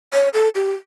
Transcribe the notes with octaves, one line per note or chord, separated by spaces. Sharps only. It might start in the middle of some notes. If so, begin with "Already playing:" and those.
C#5
A4
G4